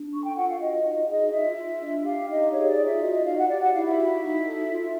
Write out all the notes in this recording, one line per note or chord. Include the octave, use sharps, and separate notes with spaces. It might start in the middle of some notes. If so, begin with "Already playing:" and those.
Already playing: D4
A4 C#6
G5
F4 F#5
F5
F#4 D#5
D#4
G#4 D#5
F4 E5
F4
D4
G4 F5
D#4 D#5
G#4 C#5
D5
F4
E5
F#4 D#5
D#5
D#4 F5
F#5
G4 D5
F#5
E4 F5
E5
F#4
D#4
A4
F4